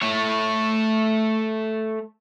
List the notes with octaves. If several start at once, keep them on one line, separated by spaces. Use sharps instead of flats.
A3 C#5